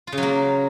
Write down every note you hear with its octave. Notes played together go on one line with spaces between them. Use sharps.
F4
C#3
F#3
A#3